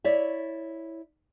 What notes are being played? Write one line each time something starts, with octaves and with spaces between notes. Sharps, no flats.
E4 C#5 D5 E5